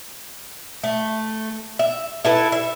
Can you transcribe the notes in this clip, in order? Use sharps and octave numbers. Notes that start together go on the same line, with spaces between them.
A3
E5
E4 A4 B4
E5